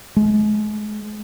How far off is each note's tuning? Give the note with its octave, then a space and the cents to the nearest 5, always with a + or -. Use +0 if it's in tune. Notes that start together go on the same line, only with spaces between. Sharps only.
G#3 +35